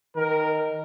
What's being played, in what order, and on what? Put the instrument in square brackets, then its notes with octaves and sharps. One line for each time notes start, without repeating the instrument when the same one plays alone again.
[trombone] D#3 [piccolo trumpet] A#4